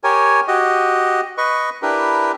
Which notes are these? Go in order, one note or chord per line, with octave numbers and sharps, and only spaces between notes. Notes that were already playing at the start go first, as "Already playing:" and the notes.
G4 A#4 C#5 G#5
F#4 G4 D#5
B4 D#5 C#6
D4 E4 G4 A#4 B4